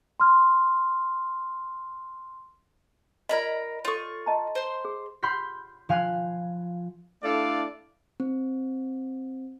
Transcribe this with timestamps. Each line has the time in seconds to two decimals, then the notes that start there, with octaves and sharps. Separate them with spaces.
0.20 C6 F6
3.29 F4 A#4 D5 D#5 A#5 B5
3.85 F4 A4 C#5 C#6
4.26 D#5 A5 A#5
4.55 C5 C6
4.85 G#4
5.23 B5 C6 F6 G6 B6
5.89 F3 F5 G#5 F6 F#6
7.23 A3 D4 E4 A4 D5 F5
8.20 C4